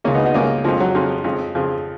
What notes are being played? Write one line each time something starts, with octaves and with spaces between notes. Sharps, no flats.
C#2 C#3 A#3 C#4
B3 D#4
D#4 F#4
C#2 C#3 A#3 C#4
F2 C#3 F3 G#3
F#3
F2 C#3 F3
F2 C#3
F2 C#3 F3